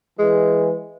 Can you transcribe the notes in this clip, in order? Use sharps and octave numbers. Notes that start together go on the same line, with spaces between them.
E3 G#3